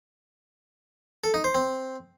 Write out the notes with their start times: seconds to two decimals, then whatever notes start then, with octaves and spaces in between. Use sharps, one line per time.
1.24 A4
1.34 D#4
1.44 C5
1.55 C4